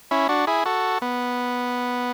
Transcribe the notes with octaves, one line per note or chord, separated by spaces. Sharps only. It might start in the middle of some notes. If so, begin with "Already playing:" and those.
C#4 E4
D4 F#4
E4 G#4
F#4 A4
B3